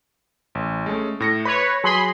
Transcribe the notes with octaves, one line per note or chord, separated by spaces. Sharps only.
A1
G#3 A3 C#4
A2 A#6 C#7
B4 C#5 B5
F#3 G#4 B5 C6